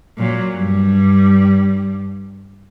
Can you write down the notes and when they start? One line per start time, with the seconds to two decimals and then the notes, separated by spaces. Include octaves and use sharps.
0.18 A#2 F#3
0.55 G2 G3